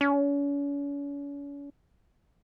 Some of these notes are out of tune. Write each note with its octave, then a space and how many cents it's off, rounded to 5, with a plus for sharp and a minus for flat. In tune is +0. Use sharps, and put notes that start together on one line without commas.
C#4 +40